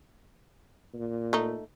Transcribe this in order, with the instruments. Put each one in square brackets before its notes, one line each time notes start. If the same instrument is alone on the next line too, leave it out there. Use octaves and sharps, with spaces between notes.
[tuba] A#2
[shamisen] A3 D#4